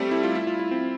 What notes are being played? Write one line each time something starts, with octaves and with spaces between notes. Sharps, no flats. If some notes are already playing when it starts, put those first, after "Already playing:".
Already playing: G3 A3 C4
E4
F4
E4
F4
E4
C4